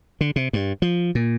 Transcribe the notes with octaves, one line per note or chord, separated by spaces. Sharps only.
D3
C3
G2
F3
A#2